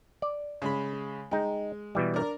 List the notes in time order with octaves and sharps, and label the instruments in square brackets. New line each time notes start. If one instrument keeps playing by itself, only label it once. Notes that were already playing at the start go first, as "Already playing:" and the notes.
[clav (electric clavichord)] D5
[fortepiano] C#3 G#3 B5
[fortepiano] G#3 [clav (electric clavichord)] D#4 G5
[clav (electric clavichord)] B2 E3 G3
[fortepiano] D4 A#4